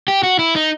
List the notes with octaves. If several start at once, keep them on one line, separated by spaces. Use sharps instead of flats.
G4
F#4
E4
D#4